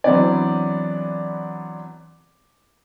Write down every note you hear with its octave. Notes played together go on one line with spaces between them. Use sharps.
E3 F#3 B3 C4 D4 D5